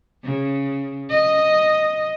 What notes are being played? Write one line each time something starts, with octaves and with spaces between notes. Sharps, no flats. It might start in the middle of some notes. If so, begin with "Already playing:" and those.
C#3
D#5